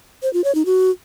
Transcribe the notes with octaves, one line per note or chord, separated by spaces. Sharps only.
C5
F4
C#5
D#4
F#4